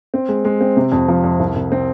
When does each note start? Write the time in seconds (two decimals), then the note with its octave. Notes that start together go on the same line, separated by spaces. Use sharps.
0.14 C4
0.29 G#3
0.45 G#3
0.61 C4
0.77 C3
0.92 F2
1.08 F3
1.24 F2
1.39 C2
1.55 C2
1.72 C4